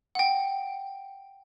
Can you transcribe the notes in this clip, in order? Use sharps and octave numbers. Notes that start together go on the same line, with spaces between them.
F#5 G5